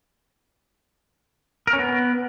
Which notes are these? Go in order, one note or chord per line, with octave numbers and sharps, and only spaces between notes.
A#4
C#4
B3